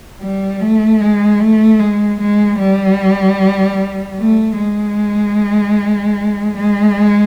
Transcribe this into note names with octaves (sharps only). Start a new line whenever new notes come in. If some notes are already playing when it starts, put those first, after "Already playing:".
G3
A3
G#3
A3
G#3
G#3
G3
A3
G#3
G#3